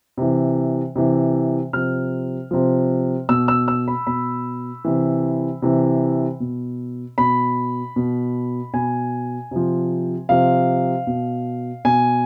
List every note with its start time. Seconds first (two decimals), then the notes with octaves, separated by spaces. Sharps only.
0.17 C3 E3
0.96 C3 E3
1.73 C3 F3 F6
2.51 C3 F3
3.29 B2 E6
3.48 E6
3.68 E6
3.88 B5
4.07 B2 B5
4.85 C3 E3
5.62 C3 E3
6.40 B2
7.18 B2 B5
7.96 B2
8.74 B2 G#5
9.51 C3 F3
10.29 C3 F3 F5
11.07 B2
11.85 B2 G#5